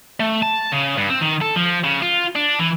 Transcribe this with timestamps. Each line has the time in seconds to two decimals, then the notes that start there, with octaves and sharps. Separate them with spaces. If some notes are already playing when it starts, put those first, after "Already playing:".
0.20 A3
0.43 A5
0.72 C#3
0.98 G2
1.10 C4
1.21 D#3
1.42 A4
1.56 F3
1.84 C#3
2.02 F4
2.36 D4
2.59 E3